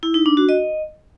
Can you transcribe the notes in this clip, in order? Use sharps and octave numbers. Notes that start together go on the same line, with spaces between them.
E4
D#4
D4
F#4
D#5